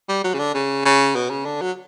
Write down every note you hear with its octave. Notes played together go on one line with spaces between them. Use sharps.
G3
F#3
C#3
D3
C#3
C#3
B2
C#3
D3
F#3